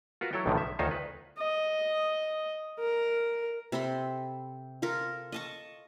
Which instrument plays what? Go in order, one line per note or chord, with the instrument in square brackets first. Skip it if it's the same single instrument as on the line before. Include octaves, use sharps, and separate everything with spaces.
[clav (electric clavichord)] F4 F#4 A#4 B4
F#3 E4 A4 C#5 G5
B1 A2 D3 D#3 F3
E5
D2 D#3 D#4 F4 C5 C#5
B4
[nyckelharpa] D#5
A#4
[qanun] C3 A4 B5 C6
F4 A4 A#4
D#5 A5 C#6